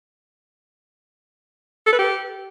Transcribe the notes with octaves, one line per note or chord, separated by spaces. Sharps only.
A4
B4
G4